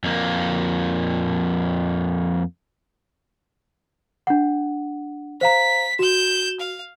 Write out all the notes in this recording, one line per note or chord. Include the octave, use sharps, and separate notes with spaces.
F2 A#3
D4 F#5
C5 F5 A#5 B6
F#4 G6 E7
F5